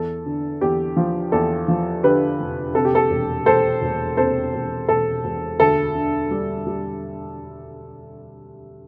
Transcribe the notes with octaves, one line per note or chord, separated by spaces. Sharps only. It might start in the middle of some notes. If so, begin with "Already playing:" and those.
Already playing: E2 A4
D3
E2 G4
F3
E2 A4
F3
D3 G4 B4
F1
C3 A4
G4
A4
E1
E1 A4 C5
E1
C3 A4 C5
E1
E1 A4
E1
D2 A4
D3
G3
G3